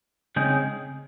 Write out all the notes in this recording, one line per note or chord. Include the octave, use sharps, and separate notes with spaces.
C#3 G#3 C4 D#4